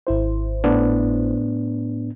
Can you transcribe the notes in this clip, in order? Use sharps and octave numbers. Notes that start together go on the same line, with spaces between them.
G#1 E4 C5
A2 B3 D4